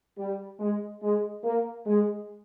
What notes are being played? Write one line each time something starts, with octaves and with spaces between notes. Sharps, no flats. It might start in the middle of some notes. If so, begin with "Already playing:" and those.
G3
G#3
G#3
A#3
G#3